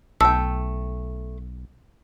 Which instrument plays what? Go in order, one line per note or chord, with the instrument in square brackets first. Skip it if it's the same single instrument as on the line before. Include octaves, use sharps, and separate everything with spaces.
[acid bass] B1 [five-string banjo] A3 G5 [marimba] E6